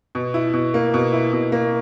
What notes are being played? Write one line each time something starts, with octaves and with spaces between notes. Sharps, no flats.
B2
E4
B2
A#3
B2
E4
B2
A#3